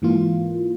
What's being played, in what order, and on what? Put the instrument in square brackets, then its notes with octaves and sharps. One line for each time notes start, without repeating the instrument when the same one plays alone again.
[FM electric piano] G#2 E3 A#3 F4